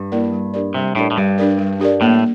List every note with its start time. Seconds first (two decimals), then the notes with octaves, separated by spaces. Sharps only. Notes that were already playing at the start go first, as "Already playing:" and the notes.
Already playing: G2
0.12 A#3 E4 A#4 D5
0.32 G3
0.54 D4 G4 A#4 D5
0.74 C3 G3
0.95 A2 D4 G4 A#4 D5
1.11 A2
1.17 G2 G3
1.38 D4 G4 A#4 D5
1.59 G3
1.80 D4 G4 A#4 D5
2.01 A2 A#3